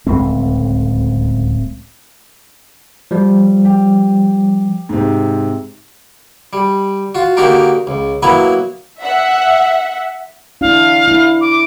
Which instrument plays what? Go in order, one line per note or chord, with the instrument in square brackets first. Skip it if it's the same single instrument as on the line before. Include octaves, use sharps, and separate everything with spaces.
[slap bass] D1 C#2 A3 C4
[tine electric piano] F3 G3
[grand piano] G4
G#2 C3
[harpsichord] G3
F4 F#4
D3 A#3 D#4 F#4 G4 A#4
C#2
F#3 A#3 B3 E4 B4 G#5
[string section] E5 F#5
[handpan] D4 E4 [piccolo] F5
[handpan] E4
[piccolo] D6